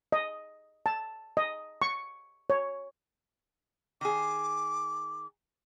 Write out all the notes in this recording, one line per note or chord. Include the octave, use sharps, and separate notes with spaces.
D#5
A5
D#5
C#6
C#5
D#3 G#4 D6